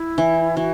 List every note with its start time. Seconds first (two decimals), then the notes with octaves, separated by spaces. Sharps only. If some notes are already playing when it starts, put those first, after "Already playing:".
Already playing: E4
0.18 E3
0.56 E3 F#4